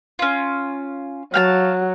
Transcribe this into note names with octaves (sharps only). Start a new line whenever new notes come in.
C#4 F4
F#3 F5 G5 A5